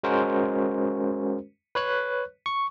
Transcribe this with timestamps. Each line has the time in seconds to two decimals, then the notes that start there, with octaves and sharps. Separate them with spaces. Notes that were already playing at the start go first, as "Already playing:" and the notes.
0.03 G#3 C#4 F#4 A#4 C5
1.75 B4 C#5 F#6
2.46 C#6